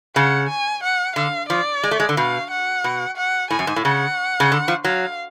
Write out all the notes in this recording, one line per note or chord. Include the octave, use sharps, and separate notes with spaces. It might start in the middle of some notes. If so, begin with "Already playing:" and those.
C#3 F#5
G#5
F#5
D3 F5
F3 D5
G#3
A3
G#3
D3
B2 F5
F#5
B2
F#5
A2 G#5
F#2
G#2
A2
C#3 F#5
C#3
D3
F3
F#3 F5